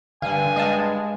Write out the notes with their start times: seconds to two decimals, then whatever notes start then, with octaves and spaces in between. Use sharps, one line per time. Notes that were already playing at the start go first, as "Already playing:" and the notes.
0.22 G2 D3 F5 G#5
0.56 G#3 D#5 F5 A5